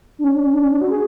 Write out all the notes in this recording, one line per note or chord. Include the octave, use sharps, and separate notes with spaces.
D4
C#4
D4
C#4
D4
C#4
D4
F#4
G#4